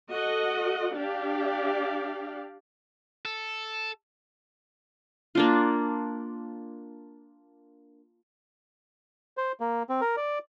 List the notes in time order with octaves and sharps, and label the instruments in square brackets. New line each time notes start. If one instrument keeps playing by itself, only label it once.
[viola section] F#4 A4 D#5 F#5
D4 G4 D5 F5
[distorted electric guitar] A4
[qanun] A#3 D4 F4
[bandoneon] C5
A#3
C4
A#4
D5